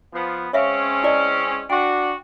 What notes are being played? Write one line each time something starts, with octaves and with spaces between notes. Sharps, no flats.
F3 B3
G#3 C4 C#4 C#5 E5 F5
E4 D5 D#5
D4 F#4 G5